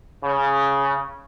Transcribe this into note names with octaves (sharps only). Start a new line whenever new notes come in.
C#3